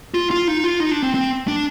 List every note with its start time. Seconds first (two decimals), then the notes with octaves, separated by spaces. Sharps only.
0.14 F4
0.31 F4
0.48 D#4
0.64 F4
0.80 D#4
0.91 D4
1.03 C4
1.14 C4
1.48 D4